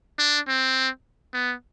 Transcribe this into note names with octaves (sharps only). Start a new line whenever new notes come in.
D4
C4
B3